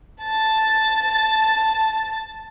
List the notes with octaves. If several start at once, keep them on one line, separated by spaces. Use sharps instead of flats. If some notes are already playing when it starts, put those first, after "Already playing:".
A5 A6